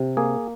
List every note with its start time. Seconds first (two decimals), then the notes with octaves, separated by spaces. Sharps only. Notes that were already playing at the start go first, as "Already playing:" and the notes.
Already playing: C3
0.17 A#3 G#4